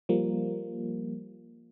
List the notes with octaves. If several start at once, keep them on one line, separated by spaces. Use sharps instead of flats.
F3 G3 A#3